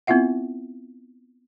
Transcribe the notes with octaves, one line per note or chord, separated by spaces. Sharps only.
B3 C4 E4 F4 E5 F#5